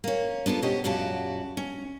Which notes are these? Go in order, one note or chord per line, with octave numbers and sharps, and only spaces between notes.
A#3 C#4
B3 D4 F4 A4
B2 C#4 G4 C5 D#5
F#2 A#2 C#3 F#4 G4 A5
C#4